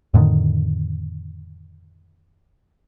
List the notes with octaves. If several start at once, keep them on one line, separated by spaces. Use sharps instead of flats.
F2 A2 D3 D#3